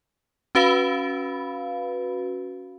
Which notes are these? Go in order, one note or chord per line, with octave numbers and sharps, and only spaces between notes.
C#4 F#4 B4 F5 B5